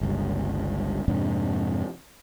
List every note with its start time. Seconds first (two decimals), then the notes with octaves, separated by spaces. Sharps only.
0.01 G1 C#2 G2
1.08 F2 G#2 C3 D4